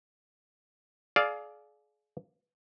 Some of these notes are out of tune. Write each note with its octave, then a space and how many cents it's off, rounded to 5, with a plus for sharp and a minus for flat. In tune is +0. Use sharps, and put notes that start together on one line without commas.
G#4 +30 D5 +0 F5 +0